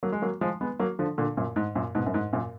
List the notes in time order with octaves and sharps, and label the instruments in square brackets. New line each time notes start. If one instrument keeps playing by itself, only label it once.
[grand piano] F#3 A#3
G#3
F#3 A#3
F3 G#3
G#3 B3
F#3 A#3
D3 F3
A#2 D3
F#2 A#2
G#2
F#2 A#2
G#2 B2
F#2
G#2
F#2 A#2